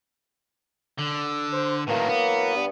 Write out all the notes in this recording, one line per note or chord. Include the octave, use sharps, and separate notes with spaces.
D3
C5
A2 D#3 E3 F#3 A#3
B3
G2